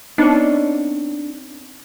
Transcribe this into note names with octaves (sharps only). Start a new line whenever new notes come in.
B3 C4 D4 D#4 C#5